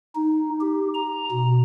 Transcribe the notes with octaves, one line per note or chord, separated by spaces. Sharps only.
D#4
G4
A#5
B2